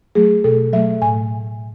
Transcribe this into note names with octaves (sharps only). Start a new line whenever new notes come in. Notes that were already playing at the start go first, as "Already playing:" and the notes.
F#3 A3 G#4
B2 A4
F#3 A3 E5
A2 G#5